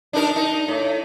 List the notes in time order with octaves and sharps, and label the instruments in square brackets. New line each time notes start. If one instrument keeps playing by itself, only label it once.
[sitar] D4 D#4 A#4
D#4
A2